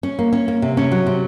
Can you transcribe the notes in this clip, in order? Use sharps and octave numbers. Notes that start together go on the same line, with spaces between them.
C#4
A#3
C#4
A#3
C3
C#4
F#3
C3